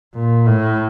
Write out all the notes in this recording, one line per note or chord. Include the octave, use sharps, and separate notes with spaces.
A#2
A2